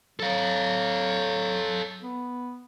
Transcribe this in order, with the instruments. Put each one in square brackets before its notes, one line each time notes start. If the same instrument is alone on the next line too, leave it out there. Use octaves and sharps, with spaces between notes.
[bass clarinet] F#3 [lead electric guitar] A4 F5
[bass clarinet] B3